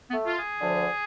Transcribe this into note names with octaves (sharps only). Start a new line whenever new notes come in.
B3
A3
F4
G#4
D2 D3 F3